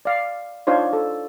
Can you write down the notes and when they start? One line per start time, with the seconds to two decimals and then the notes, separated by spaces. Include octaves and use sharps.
0.05 D5 F5
0.67 D4 D#4 F4 C5 C#5
0.93 A4